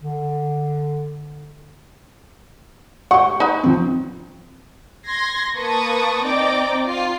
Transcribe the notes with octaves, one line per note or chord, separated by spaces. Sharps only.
D3
G4 F#5 C#6
D#4 B4
F3 C4
C6 G#6 A#6 C7
A#3 B4 A5 C#6 D#6
C4 D#4 D5 G5 A#5 D6
F4 C7